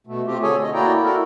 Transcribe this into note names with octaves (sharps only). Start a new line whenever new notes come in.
B2 A3
A3 C4 F4 G4
D3 G#4 A4 C#5 G#5
D#5
A#3 E4 F#4 D5 G5 A#5
E4 F#4 A4 A#4